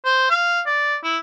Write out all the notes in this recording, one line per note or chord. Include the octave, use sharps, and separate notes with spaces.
C5
F5
D5
E4